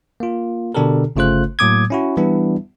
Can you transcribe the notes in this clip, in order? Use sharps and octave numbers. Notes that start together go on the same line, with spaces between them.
A#3 F4
B2 D3 D4 G4 A4 A#4
G1 C#3 A3 F4 C5 F#6
A2 F#3 A#3 D6 D#6 G#6
C#4 E4 F#4
E3 G3 B3 D4 E4